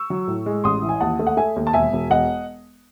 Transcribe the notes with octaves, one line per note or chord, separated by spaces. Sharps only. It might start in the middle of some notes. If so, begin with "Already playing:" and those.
Already playing: C#6 E6
F#3
A2
G#3
A1 C6 D#6
E3
G#5
D#2 F#5 A5
A3
F#5
A3 E5 G#5
D#2
A5
E1 E5 G#5
E1
E1 D#5 F#5